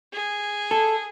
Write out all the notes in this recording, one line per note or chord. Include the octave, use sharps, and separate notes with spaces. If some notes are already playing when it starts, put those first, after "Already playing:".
G#4
A4